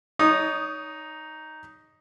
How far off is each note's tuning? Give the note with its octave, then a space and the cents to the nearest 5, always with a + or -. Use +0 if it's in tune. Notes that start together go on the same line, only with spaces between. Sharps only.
D#4 +0 C#5 +30 D#6 -15